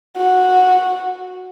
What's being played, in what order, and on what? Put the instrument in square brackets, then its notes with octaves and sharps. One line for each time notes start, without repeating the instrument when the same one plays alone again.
[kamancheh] F#4